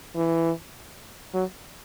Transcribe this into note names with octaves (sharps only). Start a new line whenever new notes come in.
E3
F#3